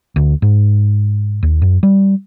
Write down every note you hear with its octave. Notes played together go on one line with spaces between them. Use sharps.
D2
G#2
D#2
F#2
G3